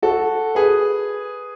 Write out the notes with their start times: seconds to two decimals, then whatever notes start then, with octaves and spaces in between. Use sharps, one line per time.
0.02 F#4 A4
0.55 G#4 B4